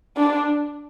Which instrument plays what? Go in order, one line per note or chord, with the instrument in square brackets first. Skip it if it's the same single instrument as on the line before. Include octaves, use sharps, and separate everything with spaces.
[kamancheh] D4